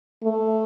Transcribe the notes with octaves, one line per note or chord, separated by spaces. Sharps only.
A3